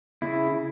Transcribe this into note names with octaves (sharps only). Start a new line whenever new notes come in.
C#3 E4